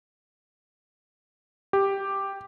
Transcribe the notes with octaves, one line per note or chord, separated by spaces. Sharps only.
G4